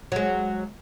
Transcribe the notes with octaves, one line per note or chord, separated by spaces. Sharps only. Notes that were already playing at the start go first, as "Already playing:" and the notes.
F#3 G#3